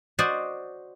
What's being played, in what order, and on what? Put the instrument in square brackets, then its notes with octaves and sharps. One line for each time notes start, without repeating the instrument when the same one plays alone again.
[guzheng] F#4 C5 D5 D#5